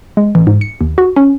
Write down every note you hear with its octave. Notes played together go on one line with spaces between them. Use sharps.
G#3
A1
G#2
C#7
D#2
F#4
C#4